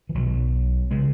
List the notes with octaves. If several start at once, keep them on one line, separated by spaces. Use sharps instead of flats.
E3
B1 B2 F#3
C#3 G#3